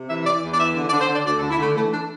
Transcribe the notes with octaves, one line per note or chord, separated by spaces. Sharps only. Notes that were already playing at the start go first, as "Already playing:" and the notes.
Already playing: C3
E3 E5
E3 D5
E2
D5
E3 E5
D3
D5
D3
C5
D3 D5
D2 D5
A4
D3
E4
D3 A3
E3 A3
D4